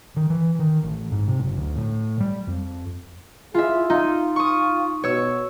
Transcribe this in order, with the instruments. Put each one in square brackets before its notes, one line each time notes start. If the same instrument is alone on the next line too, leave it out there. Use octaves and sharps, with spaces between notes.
[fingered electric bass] D#3
E3
D#3
A1
G#2
C3
F#1
D2
A2
G3
F2
[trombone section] E4 G#4 [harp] F4 E5
[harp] D#4 [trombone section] F4
[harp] C#6 D#6
[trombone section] B2 [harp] C#5 E6